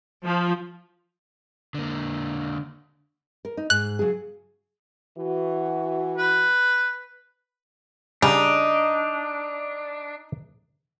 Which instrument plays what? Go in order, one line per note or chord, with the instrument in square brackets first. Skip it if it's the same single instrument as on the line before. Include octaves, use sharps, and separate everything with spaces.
[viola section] F3
[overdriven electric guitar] D3 A#3
[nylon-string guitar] A#4
D#4
[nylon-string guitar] G#2 [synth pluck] F#6
[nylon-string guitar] C#3 F#3 G#4
[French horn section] E3 F#4
[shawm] B4
[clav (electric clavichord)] C#3 G3 [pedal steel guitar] D4 [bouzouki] D#4